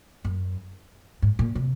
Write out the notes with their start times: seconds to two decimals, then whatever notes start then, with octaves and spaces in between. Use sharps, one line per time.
0.25 F#2
1.22 G#2
1.39 A#2
1.55 C3